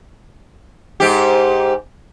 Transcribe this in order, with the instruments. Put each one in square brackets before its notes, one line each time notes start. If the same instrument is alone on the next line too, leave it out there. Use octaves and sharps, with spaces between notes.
[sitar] G#2 G4